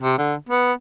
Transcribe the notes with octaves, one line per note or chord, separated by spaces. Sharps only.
C3
D3
B3